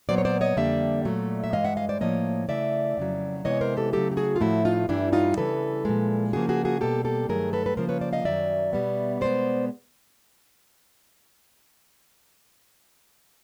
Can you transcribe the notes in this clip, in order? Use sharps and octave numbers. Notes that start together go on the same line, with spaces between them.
A#2 F#3 B3 C5 D5
C#5
C5 D5
C#5 D#5
F2 D3 G3 A#3 D5 E5
A#2 F#3 A3
E5
G2 E3 G#3 D#5 F5
E5 F#5
D#5 F5
C5 D5
A2 F3 A#3 C#5 D#5
C#3 E3 A3 D5 E5
F2 C#3 F#3
C3 E3 G#3 B3 C#5 D#5
A#4 C5
G4 A4
C#3 F#3 A3 G4 A4
G4
F#4 G#4
F4
A2 F3 A3 E4 F#4
D#4 F4
G2 E3 G3 D4 E4
D#4 F4
C#3 E3 G3 A4 B4
A#2 F3 G#3
C#3 F3 A#3 F#4 G#4
F#4 G#4
F#4 G#4
B2 G3 A#3 G4 A4
G4 A4
G2 D#3 F#3 A3 G#4 A#4
A4 B4
B4
C#3 F3 A#3 A#4 C5
B4 C#5
C5 D5
D#5 F5
F#2 D#3 F#3 D5 E5
B2 G3 B3
B2 G#3 B3 C5 D5